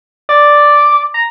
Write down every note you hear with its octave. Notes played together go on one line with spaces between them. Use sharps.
D5
A#5